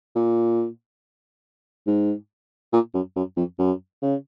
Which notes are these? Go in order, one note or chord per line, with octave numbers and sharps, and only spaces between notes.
A#2
G#2
A#2
F#2
F#2
F2
F#2
C#3